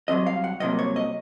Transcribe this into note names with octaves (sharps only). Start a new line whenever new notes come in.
C2 C3 F#3 D#5
F5
F#5
C2 C3 F#3 A#3 D#5
C#5
D#5